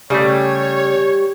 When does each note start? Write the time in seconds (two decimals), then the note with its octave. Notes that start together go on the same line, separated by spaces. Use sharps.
0.10 C#3 G3 A3 C#5